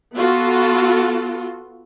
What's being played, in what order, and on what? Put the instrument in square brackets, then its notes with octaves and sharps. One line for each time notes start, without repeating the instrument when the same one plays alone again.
[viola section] B3 F4 F#4 A4